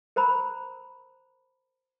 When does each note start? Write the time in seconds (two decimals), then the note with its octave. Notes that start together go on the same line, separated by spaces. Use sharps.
0.16 A#4 C5 A#5 B5